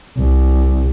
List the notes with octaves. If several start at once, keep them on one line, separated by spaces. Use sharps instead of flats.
C2